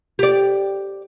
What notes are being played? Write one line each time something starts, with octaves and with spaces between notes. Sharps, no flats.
G4 D5